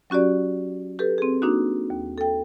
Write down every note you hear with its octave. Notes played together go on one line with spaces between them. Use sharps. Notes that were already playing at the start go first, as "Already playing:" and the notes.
F#3 C#4 F#4 G4 D5
G4 A4 B4
C4 G#4
A#3 D4 D#4 F#4
D#2
A4 G5